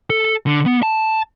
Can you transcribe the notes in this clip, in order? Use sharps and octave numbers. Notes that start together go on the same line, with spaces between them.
A4
D3
B3
A5